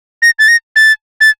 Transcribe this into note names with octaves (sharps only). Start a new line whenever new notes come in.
A#6
A6
A#6
A6
A6